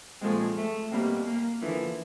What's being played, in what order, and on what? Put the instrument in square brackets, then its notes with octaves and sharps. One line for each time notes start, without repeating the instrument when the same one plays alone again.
[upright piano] A#2 F3 A3 C4 [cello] G#3
[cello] A3
[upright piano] B2 G3 C4 [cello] A#3
[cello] A#3
[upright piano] D3 F3 A#3 [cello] E3